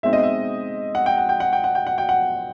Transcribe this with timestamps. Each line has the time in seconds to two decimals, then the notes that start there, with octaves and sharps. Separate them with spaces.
0.03 B2 G#3 C4 D#4 E5
0.13 D#5
0.23 E5
0.95 F#5
1.06 G5
1.18 F#5
1.29 G5
1.40 F#5
1.53 G5
1.64 F#5
1.75 G5
1.87 F#5
1.98 G5
2.09 F#5